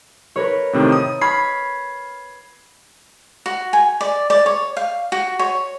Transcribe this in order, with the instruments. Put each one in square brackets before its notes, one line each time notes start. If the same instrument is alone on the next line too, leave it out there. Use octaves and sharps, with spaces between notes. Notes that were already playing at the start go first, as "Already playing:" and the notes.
[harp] A#4 B4 C#5
[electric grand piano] A2 C3 D#3
D#6
[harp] B5 C#6 [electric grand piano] F6 G#6 C7
[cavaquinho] F#4
G#5
D5
D5
C#5
F5
F#4
C#5